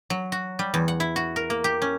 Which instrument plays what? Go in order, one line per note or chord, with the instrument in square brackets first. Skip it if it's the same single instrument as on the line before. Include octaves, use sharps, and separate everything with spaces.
[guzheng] F#3
F#4
G3
E2
F#5
E4
F#4
A#4
A#3
G4
C#4